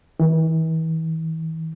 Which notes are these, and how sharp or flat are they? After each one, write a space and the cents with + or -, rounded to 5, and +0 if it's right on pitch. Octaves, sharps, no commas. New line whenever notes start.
E3 -40